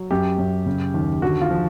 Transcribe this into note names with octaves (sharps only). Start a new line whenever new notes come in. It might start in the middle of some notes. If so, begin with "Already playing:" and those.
Already playing: F#3
F#2 G4
F#2
C#3
D#2
D3 F#4
F4
F3